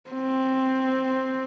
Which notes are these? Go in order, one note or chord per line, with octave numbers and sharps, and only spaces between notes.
C4